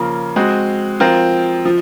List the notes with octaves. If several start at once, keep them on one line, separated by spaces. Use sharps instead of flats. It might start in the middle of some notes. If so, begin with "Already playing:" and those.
Already playing: C#3 F3 A#3
G#3 C4 F#4
F3 C4 F4 A#4
F3